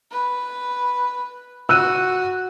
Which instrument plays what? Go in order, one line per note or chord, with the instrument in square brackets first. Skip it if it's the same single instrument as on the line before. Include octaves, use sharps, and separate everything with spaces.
[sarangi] B4
[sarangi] F#4 [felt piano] E6 F#6 D#7